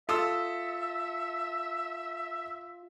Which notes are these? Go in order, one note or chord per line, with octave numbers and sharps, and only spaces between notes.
F4 A4 E5 D#6 E6